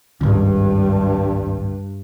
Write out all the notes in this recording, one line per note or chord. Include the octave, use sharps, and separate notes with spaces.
G#1 C#2 G2